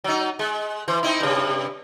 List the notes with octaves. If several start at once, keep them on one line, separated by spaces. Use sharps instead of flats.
F#3 D#4
G#3
E3 C5
C4 D#4 E4
G2 C3